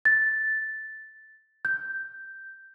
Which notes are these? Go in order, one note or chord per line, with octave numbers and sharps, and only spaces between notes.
A6
G6